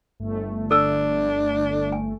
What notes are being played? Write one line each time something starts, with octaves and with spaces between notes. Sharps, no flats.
G1 A3
D4 A4 E6
G#5